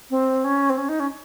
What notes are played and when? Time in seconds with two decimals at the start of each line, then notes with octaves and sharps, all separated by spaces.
0.10 C4
0.44 C#4
0.70 C4
0.78 C#4
0.89 D#4
1.00 C#4